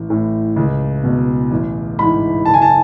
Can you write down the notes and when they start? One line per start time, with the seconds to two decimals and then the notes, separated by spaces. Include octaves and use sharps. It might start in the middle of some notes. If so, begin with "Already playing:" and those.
Already playing: A1
0.09 A2 E3
0.56 C#2
1.04 B2
1.51 A1
1.99 G#2 E3 B5
2.45 F#1 A5
2.54 G#5
2.62 A5